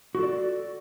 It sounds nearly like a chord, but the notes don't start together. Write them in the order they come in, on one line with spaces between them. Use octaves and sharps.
F#4 A4 D5